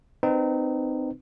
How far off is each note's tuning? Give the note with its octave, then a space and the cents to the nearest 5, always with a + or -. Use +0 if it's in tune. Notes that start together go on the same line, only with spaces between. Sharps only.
C4 -25 D#4 -25 B4 -10